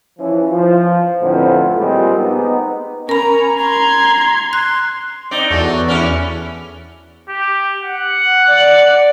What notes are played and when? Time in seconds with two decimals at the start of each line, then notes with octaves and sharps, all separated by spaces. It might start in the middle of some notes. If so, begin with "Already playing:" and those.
0.19 E3 F3 C#4
0.51 F3
1.20 F2 A2 D3 F#3 B3 C4
1.77 A#2 G3 G#3 C4
2.17 B3 D#4
3.09 C#4 A#4 A#5 B5
3.57 A#5 C6 G#6
4.53 C6 F#6
5.31 C4 D#4 D5
5.51 E2 F#3 F#4 A4 D5
5.88 C#4 E4 B4 D5
7.29 G4
7.83 F#5
8.47 D5